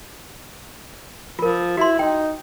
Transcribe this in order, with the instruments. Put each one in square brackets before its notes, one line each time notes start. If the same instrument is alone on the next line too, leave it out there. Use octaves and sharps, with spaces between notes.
[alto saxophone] F3 [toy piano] F4 A#4
[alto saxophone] E4 [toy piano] F#4 C6
[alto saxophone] D#4 [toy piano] G5